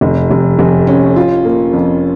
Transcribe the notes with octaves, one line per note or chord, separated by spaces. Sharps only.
F1
F1
F1
C#4
F4
A#3
F2